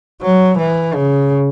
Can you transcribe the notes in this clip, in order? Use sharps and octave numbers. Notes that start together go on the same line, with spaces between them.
F#3
E3
C#3